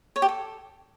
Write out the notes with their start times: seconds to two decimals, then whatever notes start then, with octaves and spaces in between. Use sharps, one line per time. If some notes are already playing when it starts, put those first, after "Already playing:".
0.16 C#5
0.22 G4
0.29 A4